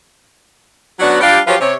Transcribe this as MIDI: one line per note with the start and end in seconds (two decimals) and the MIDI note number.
1.00 1.19 54
1.00 1.19 59
1.00 1.19 61
1.00 1.19 62
1.00 1.19 66
1.21 1.39 55
1.21 1.39 62
1.21 1.39 65
1.21 1.39 67
1.47 1.55 53
1.47 1.55 54
1.47 1.55 65
1.47 1.55 67
1.47 1.55 71
1.47 1.55 73
1.60 1.74 48
1.60 1.74 73